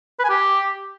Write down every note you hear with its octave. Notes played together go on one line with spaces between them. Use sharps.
B4
G#5
G4